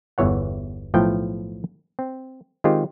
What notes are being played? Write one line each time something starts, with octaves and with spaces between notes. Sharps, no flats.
G1 E2 E3 C#5 F#5
B1 A2 F3 A3 G5
C4
D#3 G#3 C4 F4 G4